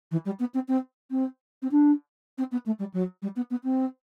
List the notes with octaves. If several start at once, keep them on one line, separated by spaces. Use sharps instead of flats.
E3
G3
B3
C4
C4
C4
C4
D4
C4
B3
A3
G3
F#3
G3
B3
B3
C4